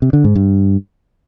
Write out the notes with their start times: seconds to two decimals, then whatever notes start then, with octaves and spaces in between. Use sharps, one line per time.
0.02 C3
0.13 D3
0.24 G#2
0.35 G2